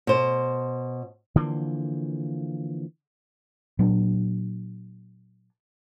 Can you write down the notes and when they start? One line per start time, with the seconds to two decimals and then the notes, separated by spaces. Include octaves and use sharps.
0.07 B2 C5
1.36 D3 E3 F3 A#3
3.79 A#2 F#3 D4